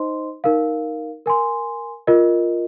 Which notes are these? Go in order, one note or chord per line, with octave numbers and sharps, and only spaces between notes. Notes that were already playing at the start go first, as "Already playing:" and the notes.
Already playing: D#4 C5 D#5 C6
D#4 A#4 F5
A#4 G#5 C6
F4 A#4 D#5